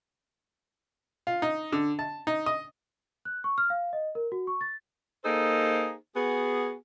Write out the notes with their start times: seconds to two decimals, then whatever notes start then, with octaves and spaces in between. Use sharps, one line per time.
1.27 F4
1.42 D#4
1.73 D3
1.99 A5
2.27 D#4
2.46 D#5
3.25 F#6
3.44 C#6
3.58 F6
3.70 F5
3.93 D#5
4.15 A#4
4.32 F#4
4.47 C#6
4.61 A6
5.24 A#3 D#4 G#4 A4 C5
6.14 B3 F#4 G#4